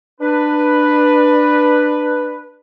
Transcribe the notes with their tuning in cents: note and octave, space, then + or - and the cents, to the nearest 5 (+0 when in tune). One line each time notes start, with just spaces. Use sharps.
D4 +20 B4 +0